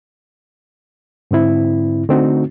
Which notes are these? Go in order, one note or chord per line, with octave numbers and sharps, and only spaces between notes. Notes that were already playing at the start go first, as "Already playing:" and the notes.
G#2 D3 C4 E4
D3 A3 C4 D#4 F#4